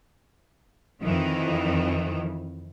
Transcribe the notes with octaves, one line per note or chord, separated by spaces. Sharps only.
F2 D#3 E3